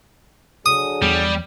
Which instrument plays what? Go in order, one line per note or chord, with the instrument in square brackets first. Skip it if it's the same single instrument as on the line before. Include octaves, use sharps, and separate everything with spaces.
[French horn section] D3 F#3 G#4 [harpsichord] D#6
[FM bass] E2 [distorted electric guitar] G3